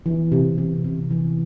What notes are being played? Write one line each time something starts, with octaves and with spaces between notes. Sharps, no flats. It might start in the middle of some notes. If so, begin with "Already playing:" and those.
E3
C3
C3
C3
E3